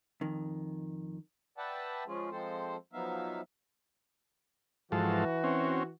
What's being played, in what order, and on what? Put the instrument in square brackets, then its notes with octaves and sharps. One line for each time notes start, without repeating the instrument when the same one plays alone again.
[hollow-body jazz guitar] F2 D#3
[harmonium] B4 D5 E5 F#5 G5 A5
F3 G#3 C#4 F4 G#4
F3 G#3 C4 A4 C5
F3 F#3 B3 D#4 E5 F5
[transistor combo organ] G#2 F3 A4 [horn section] E3 F#4
[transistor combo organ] C4 C#4